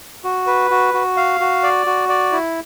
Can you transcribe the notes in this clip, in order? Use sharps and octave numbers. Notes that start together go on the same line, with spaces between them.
F#4
B4
F#4
F#4
F5
F#4
D5
F#4
D5
E4